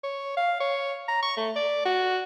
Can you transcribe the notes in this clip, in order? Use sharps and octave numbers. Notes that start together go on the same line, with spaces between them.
C#5
F5
C#5
A#5
C#6
A3
D5
F#4